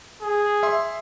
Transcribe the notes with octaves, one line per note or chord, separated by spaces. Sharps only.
G#4
E5 C6